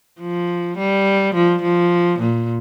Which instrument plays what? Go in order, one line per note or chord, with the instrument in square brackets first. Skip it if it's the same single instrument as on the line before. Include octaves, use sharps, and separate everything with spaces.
[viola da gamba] F3
G3
F3
F3
A#2